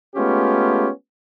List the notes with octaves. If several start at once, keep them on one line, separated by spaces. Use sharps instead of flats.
G#3 A3 B3 C#4 F4 G4